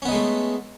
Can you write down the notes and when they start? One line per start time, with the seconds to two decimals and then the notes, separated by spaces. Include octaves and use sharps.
0.02 C#4
0.05 B3
0.08 D#4
0.11 G#3
0.15 A3